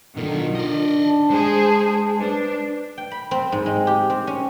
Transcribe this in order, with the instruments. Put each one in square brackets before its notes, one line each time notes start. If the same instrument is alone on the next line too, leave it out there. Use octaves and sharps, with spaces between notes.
[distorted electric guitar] B2 F#3 [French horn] D3 [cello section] D#3 [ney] F4
[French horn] D4 [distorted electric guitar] D5 D#5
[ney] A5
[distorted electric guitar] G#3 [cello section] G#4 C5
[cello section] D4 [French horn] B4 [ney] C5
[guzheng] G5
B5
C4
G#2
G#3
G4
C4
C#4